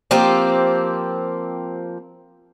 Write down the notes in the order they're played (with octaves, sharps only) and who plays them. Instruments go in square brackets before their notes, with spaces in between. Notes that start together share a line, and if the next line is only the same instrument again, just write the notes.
[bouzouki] F3 A#3 C4 G4